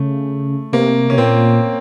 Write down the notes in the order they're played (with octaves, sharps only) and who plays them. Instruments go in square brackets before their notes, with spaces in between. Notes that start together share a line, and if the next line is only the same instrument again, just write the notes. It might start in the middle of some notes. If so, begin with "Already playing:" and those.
Already playing: [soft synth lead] C#3 [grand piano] A3
[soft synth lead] C3 [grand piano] A#3
[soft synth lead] C3 [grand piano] C#4
[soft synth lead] A#2 [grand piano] C4